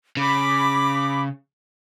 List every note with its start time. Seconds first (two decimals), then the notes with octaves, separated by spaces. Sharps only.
0.17 C#3 B5 D6